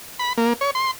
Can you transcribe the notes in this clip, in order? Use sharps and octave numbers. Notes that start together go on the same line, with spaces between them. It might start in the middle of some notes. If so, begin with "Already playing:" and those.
B5
A#3
C#5
C6